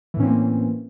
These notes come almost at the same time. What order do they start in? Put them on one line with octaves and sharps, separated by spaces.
E3 A2 C#4 C4 A#3